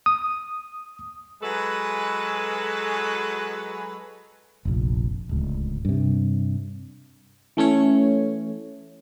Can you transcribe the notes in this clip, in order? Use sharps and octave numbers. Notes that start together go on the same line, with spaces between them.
D#6
F#3 G#3 F#4 A4 B4
F1 A#1
D1 C#2
G2 C3
E3 A3 C#4 C#5